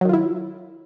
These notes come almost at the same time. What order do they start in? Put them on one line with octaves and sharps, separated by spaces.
F#3 D#3 F4 E4